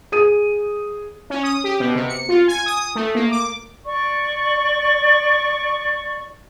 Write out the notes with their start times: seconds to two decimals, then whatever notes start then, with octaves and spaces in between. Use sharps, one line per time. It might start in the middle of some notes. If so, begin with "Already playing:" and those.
0.12 G#4 D#6 D#7
1.30 C#4
1.43 D#6
1.64 G4
1.80 B2
1.95 C3
2.08 C#7
2.29 F4
2.48 G#5
2.66 D#6
2.95 A3
3.15 A#3
3.31 D6
3.86 D5 C#6